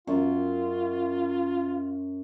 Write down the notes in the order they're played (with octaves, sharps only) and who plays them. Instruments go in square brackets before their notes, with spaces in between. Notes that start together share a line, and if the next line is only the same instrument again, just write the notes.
[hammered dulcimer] F#2 [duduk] F4